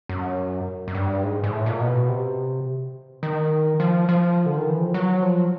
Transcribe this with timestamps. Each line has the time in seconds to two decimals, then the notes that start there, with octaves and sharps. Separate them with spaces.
0.09 F#2
0.88 F#2
0.95 G2
1.23 G#2
1.44 G#2
1.52 A2
1.66 A#2
1.80 B2
2.09 C3
3.23 D#3
3.80 F3
4.09 F3
4.46 D3
4.58 D#3
4.69 E3
4.81 F3
4.94 F#3
5.22 F3